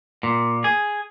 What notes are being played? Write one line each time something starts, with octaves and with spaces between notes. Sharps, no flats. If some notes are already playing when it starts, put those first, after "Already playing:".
A#2
G#4